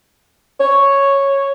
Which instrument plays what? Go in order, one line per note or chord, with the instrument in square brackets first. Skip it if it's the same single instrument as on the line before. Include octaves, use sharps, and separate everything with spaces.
[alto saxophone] C#5